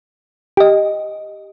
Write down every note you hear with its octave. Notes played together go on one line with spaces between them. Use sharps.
G4 D#5